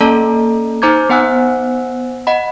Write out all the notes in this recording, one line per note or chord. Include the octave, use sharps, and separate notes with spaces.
A#3 C#4 A4 D5 A5 A#5
D#4 C5 A#5 D6 G6 G#6
B3 C5 F#5 G#5 E6 F#6
D#5 F#5 B5